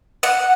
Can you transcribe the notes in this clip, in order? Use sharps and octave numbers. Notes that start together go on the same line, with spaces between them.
F#5